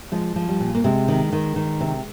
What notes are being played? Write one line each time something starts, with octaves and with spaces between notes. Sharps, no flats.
F3 G#3
F3
G3
A#2
A#3
C3 G#3
D#3
D#3
D#3
C3